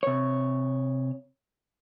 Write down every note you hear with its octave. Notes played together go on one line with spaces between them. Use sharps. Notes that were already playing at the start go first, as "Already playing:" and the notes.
C3 C#5